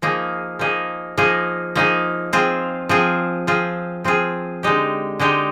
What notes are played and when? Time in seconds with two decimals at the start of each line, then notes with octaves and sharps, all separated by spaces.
0.02 F3 A#3 D#4 G#4
0.59 F3 A#3 D#4 G#4
1.18 F3 A#3 D#4 G#4
1.75 F3 A#3 D#4 G#4
2.33 F3 C4 F4 G#4
2.89 F3 C4 F4 G#4
3.47 F3 C4 F4 G#4
4.04 F3 C4 F4 G#4
4.63 D3 G#3 D#4 G4
5.19 D3 G#3 D#4 G4